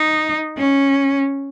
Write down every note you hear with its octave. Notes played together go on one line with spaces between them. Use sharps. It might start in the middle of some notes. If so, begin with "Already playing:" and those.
Already playing: D#4
C#4